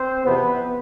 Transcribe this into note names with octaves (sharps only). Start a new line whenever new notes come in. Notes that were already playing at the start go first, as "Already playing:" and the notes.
Already playing: C4 C5
E2 C3 F3 B3 B4